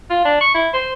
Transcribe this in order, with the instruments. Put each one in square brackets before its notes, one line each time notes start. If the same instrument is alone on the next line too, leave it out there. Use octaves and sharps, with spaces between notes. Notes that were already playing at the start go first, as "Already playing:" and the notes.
[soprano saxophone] F4
D4
C#6
E4
C5